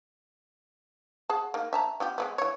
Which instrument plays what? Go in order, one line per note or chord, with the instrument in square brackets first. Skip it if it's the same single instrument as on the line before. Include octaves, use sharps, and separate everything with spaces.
[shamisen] G#4 F#5 A5
A#3 D#4
E5 A5 A#5
B3 F4 G4
G#3 A3 B3
E3 C#5